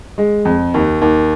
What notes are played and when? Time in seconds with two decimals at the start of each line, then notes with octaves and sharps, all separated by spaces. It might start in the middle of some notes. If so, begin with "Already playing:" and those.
0.18 G#3
0.45 F2
0.74 D#2
1.02 D#2